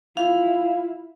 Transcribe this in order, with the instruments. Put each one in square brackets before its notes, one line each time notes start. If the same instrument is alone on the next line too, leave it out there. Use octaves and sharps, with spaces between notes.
[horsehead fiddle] E4 F4 [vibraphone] F5